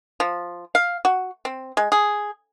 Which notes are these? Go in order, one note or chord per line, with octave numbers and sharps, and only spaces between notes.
F3
F5
F#4
C4
G#3
G#4